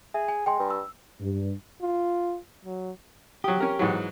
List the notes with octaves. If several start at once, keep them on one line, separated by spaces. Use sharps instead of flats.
G#4 E5
G#5
G#3 G5 G#5 C6
G2
E6
G2
F4
F#3
F#3 G4 D#6
C#4 A#4
G#2 E3 F#3